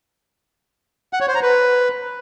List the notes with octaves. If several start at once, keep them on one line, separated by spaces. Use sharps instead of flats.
F#5
C#5
C5
A#5
B4